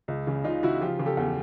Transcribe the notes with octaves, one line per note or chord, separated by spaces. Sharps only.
C#2
C#3
C#3 D#4 F4
C#3 E4 F#4
F3 F4 G4
C#3
G4 A4
E2